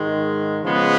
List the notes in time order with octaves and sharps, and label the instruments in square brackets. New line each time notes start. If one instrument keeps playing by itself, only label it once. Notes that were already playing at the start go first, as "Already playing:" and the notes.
Already playing: [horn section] G#2 D#3 G#3
C#3 F3 G#3 B3